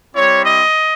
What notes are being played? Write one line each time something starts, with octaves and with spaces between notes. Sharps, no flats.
G3 C4 E4 C#5
D#5